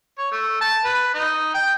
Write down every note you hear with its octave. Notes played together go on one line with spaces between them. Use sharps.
C#5
A3
A5
B4
D#4
G5